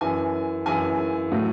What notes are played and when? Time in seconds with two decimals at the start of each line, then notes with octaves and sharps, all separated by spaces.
0.01 F#2 E3 G#5
0.66 F#2 E3 G#5
1.32 A2 F#3